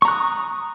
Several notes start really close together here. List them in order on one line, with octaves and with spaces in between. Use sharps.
C#6 A#5 F#6 D#6